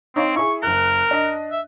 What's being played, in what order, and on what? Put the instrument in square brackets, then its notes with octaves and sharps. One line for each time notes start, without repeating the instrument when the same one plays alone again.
[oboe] C4 [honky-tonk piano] D#4 C#5 F5
[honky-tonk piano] E4 G#4 [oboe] C#6
[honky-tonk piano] F#1 F#6 [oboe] A#4
[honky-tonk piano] D4 D#5
[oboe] E5